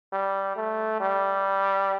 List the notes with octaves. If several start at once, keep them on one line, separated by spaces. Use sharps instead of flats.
G3
A3
G3